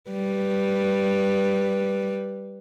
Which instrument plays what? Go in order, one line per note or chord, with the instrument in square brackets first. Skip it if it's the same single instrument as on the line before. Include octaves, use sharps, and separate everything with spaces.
[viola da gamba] G3 B4